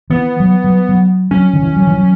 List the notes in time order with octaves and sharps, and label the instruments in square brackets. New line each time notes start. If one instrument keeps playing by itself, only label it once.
[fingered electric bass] E3 [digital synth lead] B3
[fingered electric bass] F#3
F#3
F#3
[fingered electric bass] F#3 [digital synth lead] C#4
[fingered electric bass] D#3
E3
F#3
E3
F#3